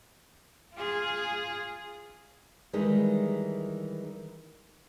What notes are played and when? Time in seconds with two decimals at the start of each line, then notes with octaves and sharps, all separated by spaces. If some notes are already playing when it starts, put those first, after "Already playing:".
0.74 F4 G#4
2.73 D#3 E3 G3 G#3